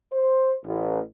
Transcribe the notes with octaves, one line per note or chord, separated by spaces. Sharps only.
C5
A1